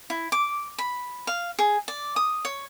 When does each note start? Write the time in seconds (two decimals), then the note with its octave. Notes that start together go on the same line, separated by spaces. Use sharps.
0.10 E4
0.32 D6
0.78 B5
1.27 F5
1.59 G#4
1.88 D5
2.16 D#6
2.45 C#5